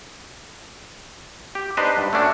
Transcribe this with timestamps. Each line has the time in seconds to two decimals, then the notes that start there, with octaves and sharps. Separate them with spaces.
1.55 G4
1.77 D4 D#4 G4 B4 C5 D#5
1.98 G2
2.13 A3 C#4 D4 F#4